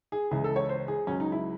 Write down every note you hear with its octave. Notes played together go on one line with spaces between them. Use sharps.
G#4
C#2 C#3 E3 G#4
A4
C#5
C5
G#4
C#2 C#3 F#3 C#4
D#4
E4